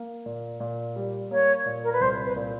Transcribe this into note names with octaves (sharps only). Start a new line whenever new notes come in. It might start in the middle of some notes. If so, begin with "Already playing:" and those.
Already playing: A#3
A#2
A#2
G3
A#3 C#5
A#2
A#4
B4
C2 C5
B4
A#2